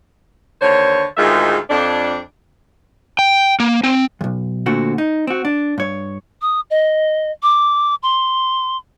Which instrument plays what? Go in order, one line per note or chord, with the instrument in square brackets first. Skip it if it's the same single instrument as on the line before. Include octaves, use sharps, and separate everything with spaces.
[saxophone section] D#2 D3 C5 C#5
D2 G#2 D#3 G#3 F4 E5
F2 D4
[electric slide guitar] G5
A#3
C4
[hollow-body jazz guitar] B1 E2
A#2 D3 A3 C4 F#4
D#4
C4 F#4
D4
G2 C#5
[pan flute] D#6
D#5
D6
C6